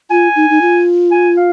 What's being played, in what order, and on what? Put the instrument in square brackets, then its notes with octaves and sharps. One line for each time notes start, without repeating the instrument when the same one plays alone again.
[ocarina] F4 [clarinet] G#5
[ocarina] D#4
D#4
F4
[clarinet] G#5
F5